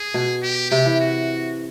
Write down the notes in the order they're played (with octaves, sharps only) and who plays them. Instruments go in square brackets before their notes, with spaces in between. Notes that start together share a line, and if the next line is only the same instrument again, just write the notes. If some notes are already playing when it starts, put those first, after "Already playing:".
Already playing: [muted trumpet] G#4
[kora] B2
[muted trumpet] G4
[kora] C3 [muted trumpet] G4
[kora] E3
[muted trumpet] F#4